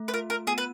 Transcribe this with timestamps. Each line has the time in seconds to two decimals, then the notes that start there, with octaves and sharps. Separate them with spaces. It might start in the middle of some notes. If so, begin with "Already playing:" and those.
Already playing: A3
0.08 B4
0.14 F4 A#4
0.30 A#4
0.47 B3 G#4
0.58 B4